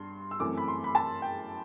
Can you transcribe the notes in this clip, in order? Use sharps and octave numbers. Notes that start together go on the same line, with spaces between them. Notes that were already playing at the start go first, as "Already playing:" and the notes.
Already playing: G2 C6
E6
F#2 E3 A3 C4 D6
B5
C6
B5
A5
G5